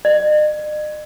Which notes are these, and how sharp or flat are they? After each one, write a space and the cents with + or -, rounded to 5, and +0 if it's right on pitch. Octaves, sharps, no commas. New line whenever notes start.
D#5 -45